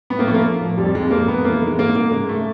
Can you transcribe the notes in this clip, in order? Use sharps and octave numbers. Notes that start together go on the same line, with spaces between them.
A2 B3
A#3
F3 A3
A#3
F3
F3
F2 G3
F2 G#3
F2 A#3
F2 B3
E3 A#3
E3 G#3
G#2 A#3
G#2 A#3
C#3 G#3
A3